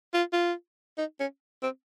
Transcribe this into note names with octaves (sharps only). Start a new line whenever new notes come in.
F4
F4
D#4
C#4
C4